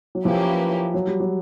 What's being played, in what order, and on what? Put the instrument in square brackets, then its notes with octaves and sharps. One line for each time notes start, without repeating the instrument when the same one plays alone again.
[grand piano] F#3
[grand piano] F3 [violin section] A#3 C#4 E4 G4 B4
[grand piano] F#3
G3
F#3